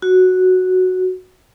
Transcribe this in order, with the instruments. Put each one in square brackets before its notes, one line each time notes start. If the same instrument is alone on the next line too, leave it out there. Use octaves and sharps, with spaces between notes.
[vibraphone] F#4